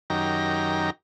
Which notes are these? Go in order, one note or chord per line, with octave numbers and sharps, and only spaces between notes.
F#2 D#3 G4 A#5